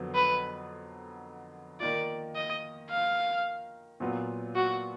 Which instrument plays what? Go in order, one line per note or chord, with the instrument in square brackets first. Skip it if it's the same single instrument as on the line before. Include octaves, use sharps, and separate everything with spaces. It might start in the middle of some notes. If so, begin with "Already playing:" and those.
Already playing: [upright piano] F2 D3 F#3 B3
[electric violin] B4
[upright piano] D#3 A#3 F4 [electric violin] D5
[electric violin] D#5
F5
[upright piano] A#2 F#3 B3 F4
[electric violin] F#4